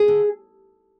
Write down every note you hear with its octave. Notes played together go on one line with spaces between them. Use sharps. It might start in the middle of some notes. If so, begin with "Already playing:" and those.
Already playing: G#4
D3